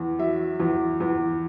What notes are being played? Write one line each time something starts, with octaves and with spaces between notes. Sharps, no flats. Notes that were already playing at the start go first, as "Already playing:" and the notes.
Already playing: E2
F#3 E5
E2
E2